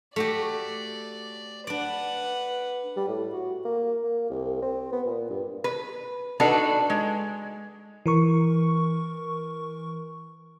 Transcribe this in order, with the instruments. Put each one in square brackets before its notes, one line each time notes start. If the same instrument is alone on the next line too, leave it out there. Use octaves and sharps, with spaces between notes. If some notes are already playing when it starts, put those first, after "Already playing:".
[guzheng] A3 F#4 G4 [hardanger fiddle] D5
[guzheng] D4 D5 [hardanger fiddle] B4 F#5
[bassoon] G3
A2
F#4
A#3
A#3
C2
C4
B3
A#2
G2
[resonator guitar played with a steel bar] B4
D4 D#4 F#4 A4 B4
G#3
[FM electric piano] E3 A#4 C#6